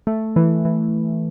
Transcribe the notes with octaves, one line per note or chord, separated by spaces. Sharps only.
A3
E3
E3